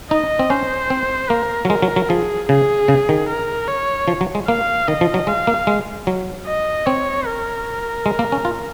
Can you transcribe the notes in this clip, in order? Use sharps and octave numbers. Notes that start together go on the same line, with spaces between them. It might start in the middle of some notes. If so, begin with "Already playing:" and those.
D#4 D#5
C4
C#4 C5
C4
A#3 A#4
F#3
G#3 A#4
F#3
F#3
F3 G#4
C#3 G#4
C#3
D#3
A#4
C#5
F3
F#3
G#3
A#3 F5
D#3 D#5
F3
F#3
G#3 F5
A#3
G#3
F#3
D#5
C4 C#5
A#4
G#3
A#3
C#4
F4